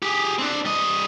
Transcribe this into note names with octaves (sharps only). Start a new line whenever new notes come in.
G4 G#4
C4 D4
G3 D#5